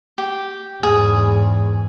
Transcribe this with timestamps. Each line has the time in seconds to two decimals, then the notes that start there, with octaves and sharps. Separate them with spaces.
0.18 G4
0.83 E2 G#2 G#4